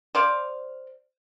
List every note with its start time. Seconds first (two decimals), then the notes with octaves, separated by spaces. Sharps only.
0.15 C5 D5 F5